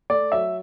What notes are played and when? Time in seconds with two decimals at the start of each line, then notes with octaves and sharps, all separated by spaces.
0.10 A3 D5
0.32 F#3 E5